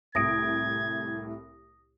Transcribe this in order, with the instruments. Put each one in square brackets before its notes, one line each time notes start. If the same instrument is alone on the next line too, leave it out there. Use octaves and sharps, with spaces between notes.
[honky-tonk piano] C2 A2 D7 [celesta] D#6 A#6 [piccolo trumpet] G#6